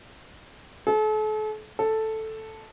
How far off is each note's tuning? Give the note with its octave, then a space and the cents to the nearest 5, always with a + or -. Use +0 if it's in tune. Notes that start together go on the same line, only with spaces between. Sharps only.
A4 -40
A4 +0